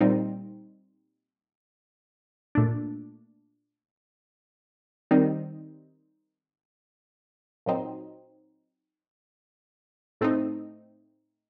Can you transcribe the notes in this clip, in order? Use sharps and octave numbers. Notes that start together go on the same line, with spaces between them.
A#2 G3 C4 D#4
A#2 A3 D4
D#3 G3 C4 D#4
A#2 F#3 C4 D#4
A2 A3 C4 D#4